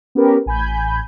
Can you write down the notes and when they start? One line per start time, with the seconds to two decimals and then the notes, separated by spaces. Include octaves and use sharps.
0.15 B3 C#4 G4 A#4 B4
0.46 A1 G#5 B5 G6